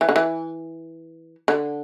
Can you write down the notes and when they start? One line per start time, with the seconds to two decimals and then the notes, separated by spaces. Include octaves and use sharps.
0.01 E3
0.09 D3
0.16 E3
1.48 D3